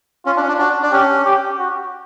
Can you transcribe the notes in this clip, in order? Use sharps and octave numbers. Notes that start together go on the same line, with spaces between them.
C#4 F4
D4
C#4
D4
D4 F#4
D4
C#4 G4
G4
F#4